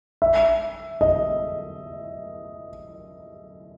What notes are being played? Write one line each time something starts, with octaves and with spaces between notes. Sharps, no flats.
E5
D#5